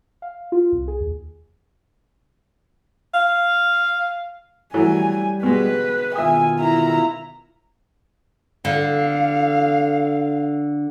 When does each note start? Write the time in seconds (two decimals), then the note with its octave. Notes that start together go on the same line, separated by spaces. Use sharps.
0.22 F5
0.52 F4
0.72 C2
0.88 G#4
1.00 D#2
3.14 F5
4.74 E3 F#3 G3 A3 G#5
5.43 B2 G#3 B4
6.16 B2 D#3 F4 E5 G#5 D#6
6.60 E4 A#5
8.65 D3 F5